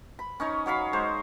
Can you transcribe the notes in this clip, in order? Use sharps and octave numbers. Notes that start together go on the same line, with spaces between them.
B5
C#4 D#4 C#5
F#3 C#5 F5 B5
G#3 C5 C#5